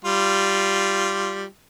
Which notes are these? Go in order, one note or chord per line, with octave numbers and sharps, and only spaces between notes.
G3 F4